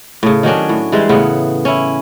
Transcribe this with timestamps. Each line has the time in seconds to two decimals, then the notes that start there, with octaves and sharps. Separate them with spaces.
0.23 A2 C#3
0.43 D#3 F#3 C#4 D4
0.69 A2
0.92 E3 G3 G#3 C5
1.09 A2 C#3 B3
1.65 C#4 E4